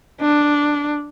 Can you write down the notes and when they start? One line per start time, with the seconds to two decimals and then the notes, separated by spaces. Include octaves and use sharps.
0.21 D4